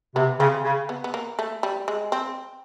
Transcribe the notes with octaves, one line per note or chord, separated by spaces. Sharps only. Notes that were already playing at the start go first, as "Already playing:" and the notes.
C3 B3
C#3 C4
C#3
B3
B3
A#3
A3
G3
G#3
C4